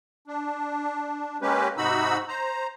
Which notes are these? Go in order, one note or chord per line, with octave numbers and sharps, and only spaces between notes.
D4
G#3 A#3 C#4 G4 B4
G#2 C3 D#4 F#4 B5 E6
C5 A#5